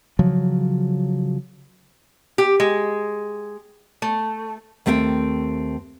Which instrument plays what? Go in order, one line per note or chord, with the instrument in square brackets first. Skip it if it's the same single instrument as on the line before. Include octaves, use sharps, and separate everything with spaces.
[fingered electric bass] C#3 F3 F#3
[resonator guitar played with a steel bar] G4
G#3
A3
[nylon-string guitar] D#2 A3 C4 E5 G5